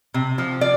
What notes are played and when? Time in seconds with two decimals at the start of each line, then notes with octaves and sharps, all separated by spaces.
0.14 C3
0.38 F3
0.61 D5